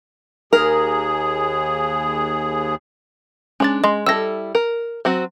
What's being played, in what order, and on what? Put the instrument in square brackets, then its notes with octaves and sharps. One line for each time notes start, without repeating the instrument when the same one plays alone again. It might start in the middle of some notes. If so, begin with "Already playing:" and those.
[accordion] D#2 G#4 [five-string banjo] A#4
[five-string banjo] G#3 D4 [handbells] C#4 A6
[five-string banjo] G#3 [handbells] D#5 C6
[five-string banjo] G3 E4 A4 [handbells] E6 A#6
[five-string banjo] A#4
F#3 C4 F#4